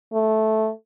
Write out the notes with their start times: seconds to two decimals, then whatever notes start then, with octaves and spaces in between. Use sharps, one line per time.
0.13 A3